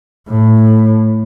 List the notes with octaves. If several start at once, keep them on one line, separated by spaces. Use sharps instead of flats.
A2